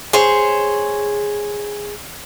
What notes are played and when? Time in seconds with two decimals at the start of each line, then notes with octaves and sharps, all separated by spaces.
0.13 G#4 C5 C#5